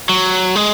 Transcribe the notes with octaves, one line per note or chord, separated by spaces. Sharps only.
F#3
G#3